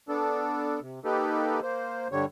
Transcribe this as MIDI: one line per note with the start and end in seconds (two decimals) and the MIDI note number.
0.09 0.80 59
0.09 0.80 62
0.09 0.80 69
0.81 0.99 48
1.05 1.60 58
1.05 1.60 63
1.05 1.60 67
1.05 1.60 69
1.05 1.60 71
1.62 2.08 58
1.62 2.08 72
2.12 2.25 43
2.12 2.25 50
2.12 2.25 55
2.12 2.25 73